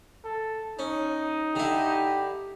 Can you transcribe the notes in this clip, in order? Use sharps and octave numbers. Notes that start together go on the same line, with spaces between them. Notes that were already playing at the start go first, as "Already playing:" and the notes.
A4
C#4 D#4
D3 E4 G4